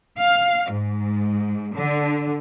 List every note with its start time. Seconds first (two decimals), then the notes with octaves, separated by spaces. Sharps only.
0.18 F5
0.71 G#2
1.75 D3